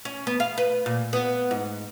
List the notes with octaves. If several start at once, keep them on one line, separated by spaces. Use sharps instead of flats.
C#4
B3
F5
B4
A#2
B3
G#2